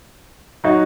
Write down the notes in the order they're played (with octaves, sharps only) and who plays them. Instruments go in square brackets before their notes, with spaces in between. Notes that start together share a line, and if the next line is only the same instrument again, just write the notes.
[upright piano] F#3 D#4 F#4